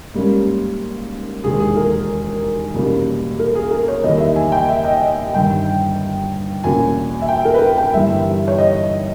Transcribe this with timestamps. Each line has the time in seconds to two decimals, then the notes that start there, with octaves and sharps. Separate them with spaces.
0.14 G#2 G3 A#3 C#4
1.44 E1 D#2 D#3 G#4
1.60 G#4
1.77 A#4
2.74 E2 B2 G3 A#3 C#4
3.39 A#4
3.55 G#4
3.71 A#4
3.88 C#5
4.04 E2 D#3 G3 A#3 D#5
4.20 E5
4.36 G#5
4.52 G5
4.69 E5
4.85 D#5
5.01 D#5
5.34 G1 G2 D#3 G5
6.64 E2 B2 A#3 C#4 G#5
7.21 E5
7.29 G5
7.45 A#4
7.54 B4
7.61 A#4
7.78 G5
7.93 G1 G2 E3 G3 E5
8.48 C#5
8.58 D#5